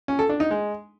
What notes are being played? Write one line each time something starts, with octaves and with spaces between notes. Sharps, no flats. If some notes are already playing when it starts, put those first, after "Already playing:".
C#4
A4
D4
D#4
G#3